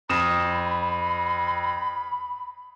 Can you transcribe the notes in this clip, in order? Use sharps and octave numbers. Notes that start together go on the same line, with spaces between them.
F2 B5 D#6 E7